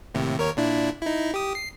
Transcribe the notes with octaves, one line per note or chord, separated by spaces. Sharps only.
D#2 A2 C3
D#2 A#4 C#5
A#2 D4 E4
D#4 E4
G4 D#6
C7